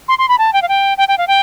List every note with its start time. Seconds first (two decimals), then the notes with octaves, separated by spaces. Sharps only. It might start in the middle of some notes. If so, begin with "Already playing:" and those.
0.08 C6
0.19 C6
0.29 B5
0.38 A5
0.53 G5
0.62 F5
0.69 G5
0.98 G5
1.08 G5
1.18 F5
1.28 G5